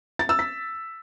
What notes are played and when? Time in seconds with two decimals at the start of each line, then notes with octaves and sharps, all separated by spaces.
0.19 A6
0.29 E6
0.39 B6